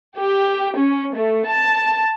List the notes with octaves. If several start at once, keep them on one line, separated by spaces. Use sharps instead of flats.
G4
C#4
A3
A5